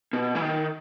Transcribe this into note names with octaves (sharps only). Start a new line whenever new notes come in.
B2
E3
D#3